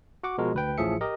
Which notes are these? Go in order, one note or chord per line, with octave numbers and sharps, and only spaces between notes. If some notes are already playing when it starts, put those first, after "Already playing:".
F#4 F#5 D6
B2 F3 G#3 F#4 A#4
D2 B4 G5
A1 A2 F3 G#4 E5 C#7
G4 A#4 D#5